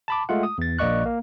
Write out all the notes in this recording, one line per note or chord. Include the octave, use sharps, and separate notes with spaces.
A5 B5 D6
G#3 A3 F4 F#5
D#6
E2 A6
A#1 A#3 D5 D#5 C#6 F#6
A#3